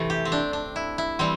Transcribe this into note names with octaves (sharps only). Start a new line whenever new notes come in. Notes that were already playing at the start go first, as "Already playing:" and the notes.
Already playing: C3 E3 A3
G4
C4
D4
D4
E4
E4
E3 G3 C4